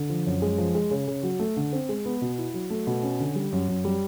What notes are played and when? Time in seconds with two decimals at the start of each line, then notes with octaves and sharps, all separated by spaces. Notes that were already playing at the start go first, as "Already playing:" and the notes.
Already playing: D3
0.10 F3
0.26 F#2
0.42 G#3
0.58 F3
0.75 G#3
0.91 C#3
1.08 C#3
1.23 F#3
1.39 A3
1.56 D3
1.73 C4
1.89 G#3
2.05 B3
2.21 B2
2.38 E4
2.54 F#3
2.70 A3
2.87 B2
3.03 C#4
3.19 D3
3.36 G3
3.52 F#2
3.68 F#2
3.85 G3